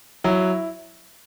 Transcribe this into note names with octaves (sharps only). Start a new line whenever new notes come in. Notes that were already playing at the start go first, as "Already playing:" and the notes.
F#3 E4